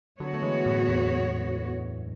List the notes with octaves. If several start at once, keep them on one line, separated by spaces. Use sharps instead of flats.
D3 F#3 B3 F#4 C#5
A3
E3 G#3
F#2 A2
E2 G#2